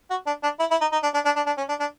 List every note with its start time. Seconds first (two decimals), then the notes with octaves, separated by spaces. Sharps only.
0.10 F#4
0.27 D4
0.43 D4
0.60 E4
0.71 E4
0.81 D#4
0.92 D#4
1.03 D4
1.14 D4
1.25 D4
1.36 D4
1.46 D4
1.58 C#4
1.69 D4
1.80 D4